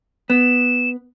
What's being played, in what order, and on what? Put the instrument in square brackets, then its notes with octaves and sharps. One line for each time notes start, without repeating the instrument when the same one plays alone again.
[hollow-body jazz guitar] B3 [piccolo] E7